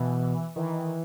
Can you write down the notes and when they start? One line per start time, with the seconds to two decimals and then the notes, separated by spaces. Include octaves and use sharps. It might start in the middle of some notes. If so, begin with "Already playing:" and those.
Already playing: B2 E3
0.56 D#3 E3